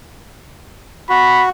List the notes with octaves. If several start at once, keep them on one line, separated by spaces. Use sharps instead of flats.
F#4 B5